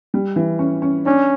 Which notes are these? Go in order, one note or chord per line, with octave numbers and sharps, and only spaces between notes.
G3
E3
C#4
C#4
C#4 D4